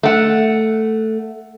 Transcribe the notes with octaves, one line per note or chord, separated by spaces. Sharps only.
A3 F#5